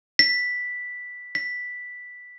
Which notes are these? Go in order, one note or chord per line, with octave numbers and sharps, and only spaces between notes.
B6
B6